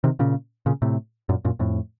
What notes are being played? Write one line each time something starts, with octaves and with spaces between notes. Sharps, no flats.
C3 D#3
A#2 C#3
A#2 C#3
A2 C3
F#2 A#2
F#2 A#2
F2 A2